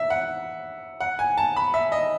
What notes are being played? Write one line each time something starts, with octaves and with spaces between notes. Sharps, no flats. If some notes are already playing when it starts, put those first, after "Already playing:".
Already playing: E5
F#5
F#5
G#5
A5
B5
E5
D#5